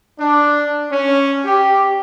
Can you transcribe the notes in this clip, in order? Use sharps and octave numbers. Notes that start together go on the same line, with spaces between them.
D4
C#4
G4